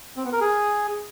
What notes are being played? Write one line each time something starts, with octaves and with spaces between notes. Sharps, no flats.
C4
B3
A#4
G#4